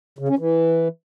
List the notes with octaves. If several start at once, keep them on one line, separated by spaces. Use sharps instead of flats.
C#3
C#4
E3